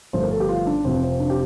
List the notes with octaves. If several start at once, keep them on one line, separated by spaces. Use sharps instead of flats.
G1 G2 F3 A3 C5
A#4
A4
G4
F4
D4
F1 F2 C3 F3 C4
C4
D4
G4